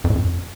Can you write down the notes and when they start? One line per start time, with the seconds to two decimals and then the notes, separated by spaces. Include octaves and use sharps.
0.04 F2
0.10 A2
0.16 F2